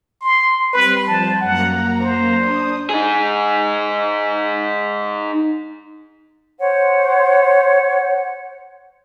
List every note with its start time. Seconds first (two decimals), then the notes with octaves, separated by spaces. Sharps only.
0.21 C6
0.73 G3 C4 B4 C6
1.07 F3 G3 C5 A5
1.41 F#2 A#3 F#5 A#5
2.00 C5
2.33 D4 D#6
2.89 D#4 G#4
6.58 C5 C#5 F#5